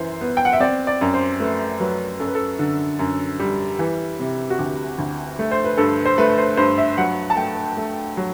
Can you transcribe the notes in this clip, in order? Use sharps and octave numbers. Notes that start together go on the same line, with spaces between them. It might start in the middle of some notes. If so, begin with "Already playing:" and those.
Already playing: F#2 E3 C5
B3
G5
F#5
E5
C4 D5
D5
F#2
C5
A3 B4
F#3 B4
F#2 A4
B4
A4
D3
F#2
G3
E3
C3
F#4
D2 G4
D2
A3
C5
B4
G2 A4
C5
A3 B4
C5
G2 C5
E5
F#3 F#5
A5
A3 G5
A3
F#3